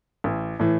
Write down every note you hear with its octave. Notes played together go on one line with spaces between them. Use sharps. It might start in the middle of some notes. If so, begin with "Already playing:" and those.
A1
A2 E3